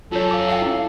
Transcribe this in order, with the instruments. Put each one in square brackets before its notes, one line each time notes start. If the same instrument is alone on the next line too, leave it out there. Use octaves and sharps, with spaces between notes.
[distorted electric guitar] F#2 [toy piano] F4 C#5 [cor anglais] A4
[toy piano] F5 D6
[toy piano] E5 G5 [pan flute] F5
[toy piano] E4